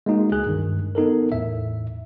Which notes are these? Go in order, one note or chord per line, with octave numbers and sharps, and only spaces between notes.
G#3 A#3 D#4 F#4
C#2 G#4 F#6
G2 D#3
B3 D#4 A4 A#4
E2 A2 E5